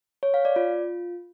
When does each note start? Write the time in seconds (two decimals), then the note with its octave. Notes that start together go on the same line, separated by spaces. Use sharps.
0.23 C#5
0.34 F5
0.45 D5
0.56 F4